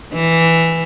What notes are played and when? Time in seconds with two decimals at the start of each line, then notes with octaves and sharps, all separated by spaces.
0.14 E3